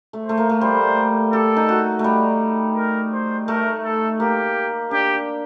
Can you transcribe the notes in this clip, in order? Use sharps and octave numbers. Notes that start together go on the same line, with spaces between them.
A3
A3 C5
A#3
A3
G3 C5
G4 A4
D#4
F#4
A3
G3
A#4
C5
A3 A#4
A4
A#3 G4
D4 G4